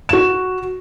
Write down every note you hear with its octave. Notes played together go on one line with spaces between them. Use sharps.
F#4 E7